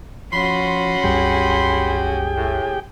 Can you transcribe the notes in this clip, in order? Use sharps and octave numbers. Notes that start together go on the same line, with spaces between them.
F3 C#4 F#4 B5 C6
C2 F#2 G3 G4 G#4 G5
A2